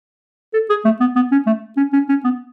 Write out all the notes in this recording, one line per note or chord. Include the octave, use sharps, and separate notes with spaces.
A4
G#4
A3
B3
B3
C#4
A3
C#4
C#4
C#4
B3